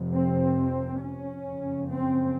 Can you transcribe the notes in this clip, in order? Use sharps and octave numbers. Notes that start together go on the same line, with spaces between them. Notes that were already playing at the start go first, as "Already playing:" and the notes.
Already playing: F1 F2 C3
C4
C#4
F#1 F2 C#3
C4